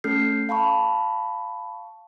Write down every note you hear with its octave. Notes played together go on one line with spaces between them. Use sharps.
A3 C#4 A4 F6 G6 C7
F5 A5 B5 C#6